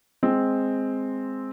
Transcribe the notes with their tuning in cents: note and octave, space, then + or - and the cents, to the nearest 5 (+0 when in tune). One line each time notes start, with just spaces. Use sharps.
G#3 +0 C4 +0